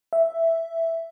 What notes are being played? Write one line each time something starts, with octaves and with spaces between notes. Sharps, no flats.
E5